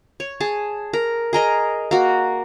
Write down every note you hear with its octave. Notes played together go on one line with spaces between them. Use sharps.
C#5
G#4 A5
A#4
G#4 A#4 D#5
A#3 F#4